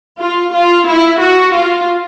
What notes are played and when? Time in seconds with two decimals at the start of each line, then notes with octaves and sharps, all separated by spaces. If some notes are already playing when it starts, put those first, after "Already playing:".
0.20 F4
0.54 F4
0.88 E4
1.22 F#4
1.55 F4